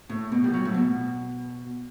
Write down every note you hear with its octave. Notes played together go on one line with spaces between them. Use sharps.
A2
B2
G3
F#3
A2
B2